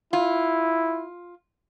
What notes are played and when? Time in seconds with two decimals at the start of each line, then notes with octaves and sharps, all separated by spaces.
0.13 E4 F4